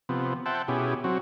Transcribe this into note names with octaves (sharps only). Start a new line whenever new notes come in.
C3 F3 B3
C5 E5 F#5 G5 A5
B2 C#4 E4 G4 G#4
F#3 C4 F#4